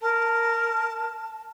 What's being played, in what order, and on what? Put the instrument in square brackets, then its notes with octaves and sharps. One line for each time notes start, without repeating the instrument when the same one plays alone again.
[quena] A#4 [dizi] A5